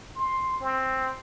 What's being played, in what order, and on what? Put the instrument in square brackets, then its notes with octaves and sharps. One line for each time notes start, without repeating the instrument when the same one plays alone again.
[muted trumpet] C6
C4